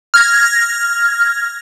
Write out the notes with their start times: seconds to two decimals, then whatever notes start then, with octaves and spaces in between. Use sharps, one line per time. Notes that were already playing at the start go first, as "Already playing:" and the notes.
0.14 F6 G#6 A#6